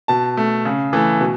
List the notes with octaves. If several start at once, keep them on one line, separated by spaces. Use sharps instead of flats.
B2 A5
A3
C#3
E3 A3
B2